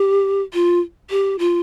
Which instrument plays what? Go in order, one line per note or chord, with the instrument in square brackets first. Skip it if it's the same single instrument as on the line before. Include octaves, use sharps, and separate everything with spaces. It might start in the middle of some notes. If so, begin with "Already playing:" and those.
Already playing: [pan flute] G4
F4
G4
F4